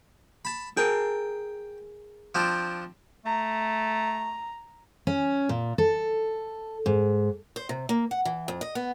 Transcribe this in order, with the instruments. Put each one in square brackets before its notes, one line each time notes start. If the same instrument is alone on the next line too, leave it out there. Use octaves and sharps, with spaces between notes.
[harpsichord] A5 B5
[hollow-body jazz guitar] G#4 A#4 [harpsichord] G5
[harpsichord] F3 C4 D4
[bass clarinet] A3 [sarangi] A#5
[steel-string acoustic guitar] C#4
A#2
A4
G#2
C5
C3
A#3
F#5
E3
F2
D#5
B3